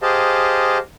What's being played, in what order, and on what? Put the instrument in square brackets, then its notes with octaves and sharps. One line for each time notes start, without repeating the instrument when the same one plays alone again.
[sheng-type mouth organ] G4 G#4 C5 D#5 F5 A5